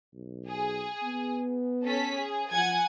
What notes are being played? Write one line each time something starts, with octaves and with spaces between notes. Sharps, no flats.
B1
G#4
B3
C#4 A4 B6
G#4
F3 F#5 G#5 G#6